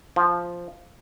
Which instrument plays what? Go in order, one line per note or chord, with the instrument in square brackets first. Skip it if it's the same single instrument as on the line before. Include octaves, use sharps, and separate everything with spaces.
[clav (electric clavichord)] F3